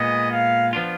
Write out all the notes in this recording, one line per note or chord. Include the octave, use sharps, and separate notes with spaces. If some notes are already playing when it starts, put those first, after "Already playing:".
Already playing: A#2 G#3 B3 D#5
F5
F3 B3 D4 F4